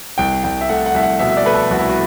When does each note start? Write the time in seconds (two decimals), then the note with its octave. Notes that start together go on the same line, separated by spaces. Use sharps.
0.18 C2 G5
0.44 C2 G5
0.61 E5
0.69 A3 F#5
0.86 F#5
0.94 C2 E5
1.03 F#5
1.19 B2 E5
1.29 E5
1.37 D5
1.45 A3 B4
1.54 A4
1.71 C2 F#4
1.79 E4
1.89 F#4